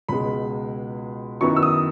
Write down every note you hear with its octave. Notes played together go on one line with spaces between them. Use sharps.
C#2 B2 G#3 B5
F#2 D#3 F#3 B3 E4 C#6
E6
D#6